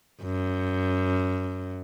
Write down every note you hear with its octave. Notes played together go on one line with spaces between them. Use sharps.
F#2